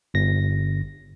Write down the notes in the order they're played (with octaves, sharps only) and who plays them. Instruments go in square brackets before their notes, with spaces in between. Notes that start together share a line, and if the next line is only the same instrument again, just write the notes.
[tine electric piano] G1 A#6